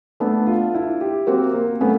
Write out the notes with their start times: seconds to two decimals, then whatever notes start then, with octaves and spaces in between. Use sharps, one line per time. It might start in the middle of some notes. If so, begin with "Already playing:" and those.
0.20 A3 B3 D4
0.47 F4
0.75 E4
1.01 G4
1.27 A#3 C4 F#4
1.54 A#3
1.81 A3 B3 C#4